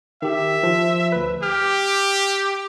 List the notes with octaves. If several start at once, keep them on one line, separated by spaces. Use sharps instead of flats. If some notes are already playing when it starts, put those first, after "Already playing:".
D#3 G4 E5
F3
D2 B4
G4 F6